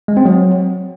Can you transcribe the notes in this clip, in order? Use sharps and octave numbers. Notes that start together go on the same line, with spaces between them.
G#3
C4
F#3